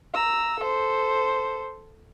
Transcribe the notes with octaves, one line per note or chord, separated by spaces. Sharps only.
A#5 E6
A4 C5